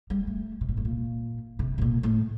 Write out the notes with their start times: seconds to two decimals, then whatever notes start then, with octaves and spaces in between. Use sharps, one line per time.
0.10 G3
0.27 A3
0.61 C3
0.69 A#2
0.77 A2
0.85 A#2
1.59 C3
1.78 A2
1.82 A#2
2.03 A2